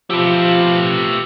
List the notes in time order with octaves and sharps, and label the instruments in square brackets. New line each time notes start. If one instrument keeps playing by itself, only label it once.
[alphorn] F3 [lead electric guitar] A3 B4 [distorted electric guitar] G4 E5